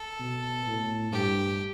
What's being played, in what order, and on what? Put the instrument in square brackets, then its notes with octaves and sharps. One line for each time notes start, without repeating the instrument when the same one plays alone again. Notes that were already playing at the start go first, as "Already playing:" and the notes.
Already playing: [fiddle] A4
[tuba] B2
A2
[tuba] G2 [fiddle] G4